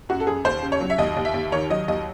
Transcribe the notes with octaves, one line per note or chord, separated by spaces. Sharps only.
F#2 F#4
A4
F#2 G#4
D#2 C5
C#3
C#5
F#3
E5
D#2 D#5
D#2
E5
D#2
D#3 C#5
F#3 D#5
D#2 D#5